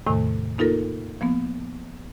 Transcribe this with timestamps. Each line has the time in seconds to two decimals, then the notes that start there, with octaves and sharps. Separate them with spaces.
0.07 E2 A2 C3 D#3 A3
0.58 A#3 D#4 F4 A4 A#4
1.21 F3 A#3 B3